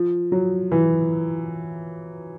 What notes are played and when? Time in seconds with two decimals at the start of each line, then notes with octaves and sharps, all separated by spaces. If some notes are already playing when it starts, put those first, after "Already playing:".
Already playing: F3
0.32 F#3
0.72 E3